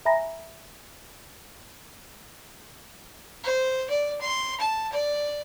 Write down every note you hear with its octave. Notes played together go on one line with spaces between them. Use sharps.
E5 G#5 A#5 B5 A#6
C5
D5
C6
A5
D5